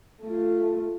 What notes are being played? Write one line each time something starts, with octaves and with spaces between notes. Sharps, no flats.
A3 F4